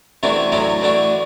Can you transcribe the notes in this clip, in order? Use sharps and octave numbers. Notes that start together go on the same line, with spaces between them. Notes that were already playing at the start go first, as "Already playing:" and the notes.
C3 E3 A3 D4 F#4
A2 F#3 A3 D4 F#4
E3 A3 D4 F#4